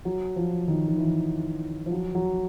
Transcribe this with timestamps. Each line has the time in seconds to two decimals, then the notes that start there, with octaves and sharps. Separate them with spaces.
0.05 F#3
0.36 F3
0.68 D#3
0.88 D#3
0.98 E3
1.86 F3
1.91 F#3
2.15 F#3